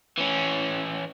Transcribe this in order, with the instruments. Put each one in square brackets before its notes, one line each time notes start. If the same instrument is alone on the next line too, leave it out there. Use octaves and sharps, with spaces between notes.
[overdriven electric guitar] E3 C#4